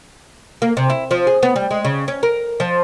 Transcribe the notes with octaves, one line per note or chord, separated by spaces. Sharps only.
A#3
C3
E4
F3
G#4
B3
G3
G#3
C#3
C#4
A#4
F3